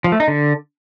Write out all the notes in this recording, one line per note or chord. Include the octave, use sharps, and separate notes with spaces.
F3
A3
D#4
D3